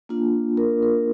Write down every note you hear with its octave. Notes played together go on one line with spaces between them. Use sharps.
A#3 D4 F4
A#4
A#4